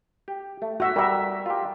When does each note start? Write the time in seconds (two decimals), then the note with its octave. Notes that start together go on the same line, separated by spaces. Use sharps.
0.28 G4
0.62 A3
0.80 F#4 E5
0.96 G3 A#4 E5
1.46 F4 G4